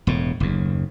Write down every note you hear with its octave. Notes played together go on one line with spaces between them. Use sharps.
E1 A2
F#1 D#2